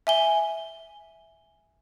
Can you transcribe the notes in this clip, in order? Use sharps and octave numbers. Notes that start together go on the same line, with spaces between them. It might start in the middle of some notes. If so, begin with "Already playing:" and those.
E5 G#5 G7